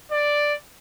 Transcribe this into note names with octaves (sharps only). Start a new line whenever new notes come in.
D5